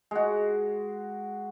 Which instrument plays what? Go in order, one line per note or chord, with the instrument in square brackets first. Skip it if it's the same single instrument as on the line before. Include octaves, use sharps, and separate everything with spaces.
[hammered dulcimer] G#3 F#4